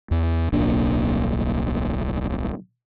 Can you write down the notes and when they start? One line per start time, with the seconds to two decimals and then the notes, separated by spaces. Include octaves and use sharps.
0.11 E2
0.53 D1 B1 A#3 D4